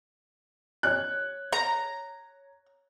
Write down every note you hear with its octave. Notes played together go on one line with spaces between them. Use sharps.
C#5 F#6
A#5